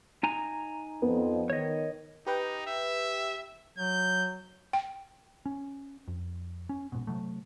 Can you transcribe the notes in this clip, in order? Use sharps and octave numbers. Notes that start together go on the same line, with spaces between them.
D#4 G#5 A#5
F2 B3
D#3 C#5 D#5
D#4 G4 B4 G5
E5
F#3 G6
G5
C#4
F2
C#4
A#1 G#2 B2
C3 F#3 A3